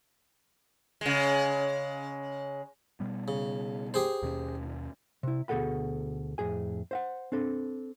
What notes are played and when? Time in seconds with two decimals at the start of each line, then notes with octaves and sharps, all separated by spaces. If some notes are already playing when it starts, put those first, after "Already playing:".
1.01 C#3 G#3
3.00 B2 G3 B3
3.28 C#3
3.94 G4 G#4 C5
4.22 D#2 B2 C#4
5.23 C3 E4
5.48 D2 B2 G#4 A4 F#5 B5
6.38 F2 A2 G#4 G#5
6.91 C5 F5 F#5
7.32 C4 D4 A4